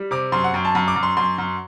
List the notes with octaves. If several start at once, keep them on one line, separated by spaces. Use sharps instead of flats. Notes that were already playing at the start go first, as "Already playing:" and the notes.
Already playing: G3
C3 D6
F#2 C6
F#5
F#2 G5
A5
F#2 B5
D6
F#2
C6
F#2 C6
F#2